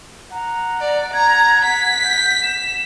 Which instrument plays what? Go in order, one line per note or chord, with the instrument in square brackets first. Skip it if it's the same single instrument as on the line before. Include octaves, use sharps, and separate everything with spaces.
[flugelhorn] F#5 [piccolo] A#5
[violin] D5
[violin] A#5 [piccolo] G#6
[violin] B6
[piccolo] G6
E7